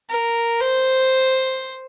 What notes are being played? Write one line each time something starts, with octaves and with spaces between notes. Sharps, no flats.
A#4
C5